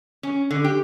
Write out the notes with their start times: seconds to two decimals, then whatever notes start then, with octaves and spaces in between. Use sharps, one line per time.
0.23 C#4
0.51 D3
0.64 G4